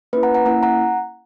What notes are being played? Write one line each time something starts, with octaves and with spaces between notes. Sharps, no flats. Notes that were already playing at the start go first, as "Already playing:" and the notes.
A#3 C#4 E4 B4
F#5 A#5
F#5 A#5
A#3 C#4 E4 F#5 A#5
F#5 A#5